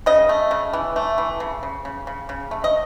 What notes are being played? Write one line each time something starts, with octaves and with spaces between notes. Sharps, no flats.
C#3 D#5
A3
C#3
E3
A3
E3
C#3
C#3
C#3
C#3
C#3
A3
D#5